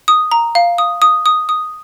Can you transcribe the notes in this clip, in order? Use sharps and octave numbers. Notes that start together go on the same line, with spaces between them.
D#6
A#5
F5
D#6
D#6
D#6
D#6